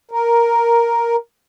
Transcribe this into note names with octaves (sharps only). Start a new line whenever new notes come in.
A#4